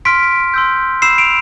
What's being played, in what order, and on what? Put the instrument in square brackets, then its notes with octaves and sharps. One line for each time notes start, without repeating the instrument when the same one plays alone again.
[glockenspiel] C6 F6 B6 D7
C6 E6 G6
B5 E6 G6 C7 E7
D7 F7